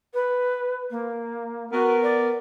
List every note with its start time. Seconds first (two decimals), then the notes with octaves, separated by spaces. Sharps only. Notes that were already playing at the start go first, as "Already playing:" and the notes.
0.14 B4
0.90 A#3
1.72 B3 F#4 A#4
2.03 D5